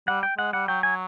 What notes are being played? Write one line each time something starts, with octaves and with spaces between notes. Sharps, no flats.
G3 F#5
G5
G#3 F#5
G3 F#5
F#3 G5
F#3 G#5